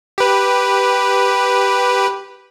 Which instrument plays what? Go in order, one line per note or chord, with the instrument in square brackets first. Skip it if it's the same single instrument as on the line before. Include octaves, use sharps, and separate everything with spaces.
[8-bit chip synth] G4 B4